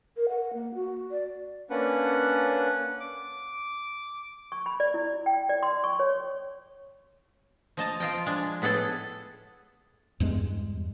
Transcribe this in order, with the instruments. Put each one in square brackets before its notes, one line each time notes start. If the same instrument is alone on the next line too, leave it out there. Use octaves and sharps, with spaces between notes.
[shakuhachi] A#4
F#5
A#3
F#4
D5
[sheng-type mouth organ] A#3 C#4 D4 B4 F#5
D6
[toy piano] C#6
B5
D5
E4
G5
D5
C6
C#6
C#5
[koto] F3 D#5 A5 A#5
F3 F4 D#5 G5
G#3 D4
A2 B3 G#4 A4 A5
[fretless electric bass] E2 G2 G#3